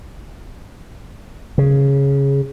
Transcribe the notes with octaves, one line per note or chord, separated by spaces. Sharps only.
C#3